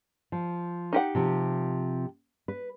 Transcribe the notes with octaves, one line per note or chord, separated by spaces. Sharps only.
F3
D#4 G4 F#5
C3 F3
B4